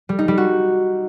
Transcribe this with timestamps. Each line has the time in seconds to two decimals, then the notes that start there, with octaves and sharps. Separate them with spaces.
0.09 G3
0.19 D#4
0.28 G3
0.38 F#4